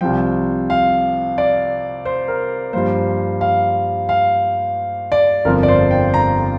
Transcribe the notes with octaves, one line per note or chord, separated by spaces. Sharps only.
C2 C3 F3 G5
F5
D5
C5
A#4
G2 F3 A#3 C5
F5
F5
D5
G1 F2 F3 A#4
D5
C5
G5
A#5